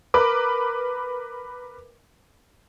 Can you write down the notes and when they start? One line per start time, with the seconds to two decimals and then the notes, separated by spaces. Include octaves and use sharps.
0.14 A#4 B4 D6